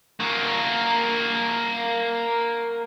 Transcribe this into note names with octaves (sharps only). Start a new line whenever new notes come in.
A#3 F#4